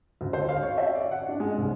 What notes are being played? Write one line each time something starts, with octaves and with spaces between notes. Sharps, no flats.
D2
C5
F5
C#5
E5
D5
F#5
D4
G#3
C2